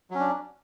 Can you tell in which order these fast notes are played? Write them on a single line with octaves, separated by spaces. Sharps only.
F#3 C#4 D4